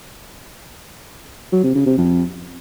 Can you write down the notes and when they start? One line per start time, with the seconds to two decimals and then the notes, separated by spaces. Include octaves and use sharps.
1.52 F#3
1.63 C3
1.75 C#3
1.86 C3
1.97 F2